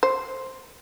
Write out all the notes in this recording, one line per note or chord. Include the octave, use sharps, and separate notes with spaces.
C5